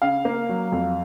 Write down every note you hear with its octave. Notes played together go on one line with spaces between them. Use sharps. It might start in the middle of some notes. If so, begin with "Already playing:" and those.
C#3 F5
A#3
F#3
F2